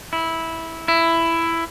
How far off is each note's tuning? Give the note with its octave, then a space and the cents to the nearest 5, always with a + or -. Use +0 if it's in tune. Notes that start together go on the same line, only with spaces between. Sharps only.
E4 -10
E4 +10